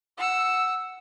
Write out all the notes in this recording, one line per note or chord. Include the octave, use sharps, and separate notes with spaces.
F#5 E6